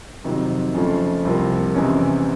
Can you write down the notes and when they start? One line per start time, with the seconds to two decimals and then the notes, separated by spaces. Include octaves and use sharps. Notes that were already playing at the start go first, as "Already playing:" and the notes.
0.24 F2 C3 D#3 F#3
0.74 F2 C#3 F3 A3
1.25 C2 C3 F3 A#3
1.74 E2 C3 E3 G#3 C#4